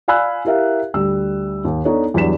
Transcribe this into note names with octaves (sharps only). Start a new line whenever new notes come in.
D5 F5 G#5 B5 E6 F#6
E4 G4 A#4 E5 F5
D2 G3 E6
D#2
B3 D4 D#4 A4 C#5
E2 F#3 G3 D4 B6 E7